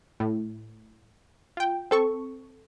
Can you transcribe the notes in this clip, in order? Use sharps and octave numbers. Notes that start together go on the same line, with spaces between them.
A2
F4 G5
C4 A4 C#6